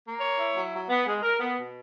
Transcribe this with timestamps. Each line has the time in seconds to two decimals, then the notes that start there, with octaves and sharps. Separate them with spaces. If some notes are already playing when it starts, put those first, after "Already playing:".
0.04 A#3
0.21 C#5
0.38 E4
0.55 F#3
0.73 F#3
0.89 B3
1.06 G#3
1.23 A#4
1.40 B3
1.57 B2